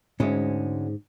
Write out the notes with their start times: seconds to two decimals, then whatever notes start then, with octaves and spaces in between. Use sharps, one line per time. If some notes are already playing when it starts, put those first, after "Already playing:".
0.20 D2 G#2 G#3 C#4